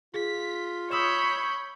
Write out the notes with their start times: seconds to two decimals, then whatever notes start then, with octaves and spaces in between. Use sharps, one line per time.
0.14 F4 G#4 B6
0.91 C#5 B5 D#6 E6 G6 E7